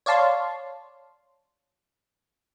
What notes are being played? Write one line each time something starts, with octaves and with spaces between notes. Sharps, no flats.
C#5 D5 F5 A5 C6